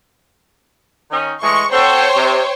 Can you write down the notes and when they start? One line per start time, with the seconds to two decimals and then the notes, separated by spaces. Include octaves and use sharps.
1.11 D#3 C#4 D#4
1.42 A2 E3 G#3 C#6
1.72 C4 F#4 A4 C5 C#5 G5
2.16 C3